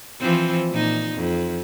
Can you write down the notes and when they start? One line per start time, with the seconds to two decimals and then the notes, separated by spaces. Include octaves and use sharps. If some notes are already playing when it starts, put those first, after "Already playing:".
0.20 E3 F3 C4
0.71 A#2 D#4
1.15 F2